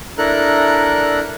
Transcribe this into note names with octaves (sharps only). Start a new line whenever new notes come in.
D4 E4 A4 A#4 A#5 F#6